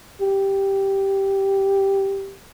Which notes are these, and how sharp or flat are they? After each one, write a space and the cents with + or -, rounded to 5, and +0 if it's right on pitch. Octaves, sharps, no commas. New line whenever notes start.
G4 -5